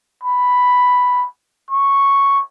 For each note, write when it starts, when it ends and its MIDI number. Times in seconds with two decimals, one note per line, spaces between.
0.24 1.27 83
1.71 2.42 85